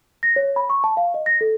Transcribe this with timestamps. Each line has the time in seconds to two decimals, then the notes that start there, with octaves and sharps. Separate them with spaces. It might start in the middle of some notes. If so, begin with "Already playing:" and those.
0.23 A#6
0.36 C#5
0.56 B5
0.70 C#6
0.84 A5
0.97 F5
1.14 D#5
1.26 A#6
1.41 A4